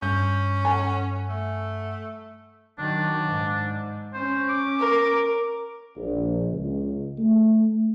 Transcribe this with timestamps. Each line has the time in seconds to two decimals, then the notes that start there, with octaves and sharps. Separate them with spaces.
0.02 G2 C#4 G6
0.65 A4 F#5 G#5
1.29 A3
2.79 D#3 F#3 D4
3.26 G#2
4.13 C#4 C5
4.49 D6
4.79 A#4
5.95 A#1
6.48 C#2
7.18 A3